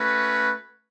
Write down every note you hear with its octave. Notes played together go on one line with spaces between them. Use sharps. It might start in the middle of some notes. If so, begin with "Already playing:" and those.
Already playing: A3 C#4 F#4 B4